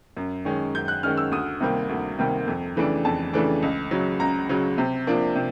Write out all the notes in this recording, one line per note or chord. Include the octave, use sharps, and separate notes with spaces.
F#2
D#3 G#3 C#4
F#2 G6
F#6
D#3 G#3 C#4 F6
E6
D2 D#6
C3 D#3 G3 A#3
D2
C3 D#3 G3 A#3
F2
C#3 E3 A3 D4
F2 A5
C#3 E3 A3 D4
C#2
C#3 F#3
C#2 A#5
C#3 F#3
C3
F3 A#3 D4
C3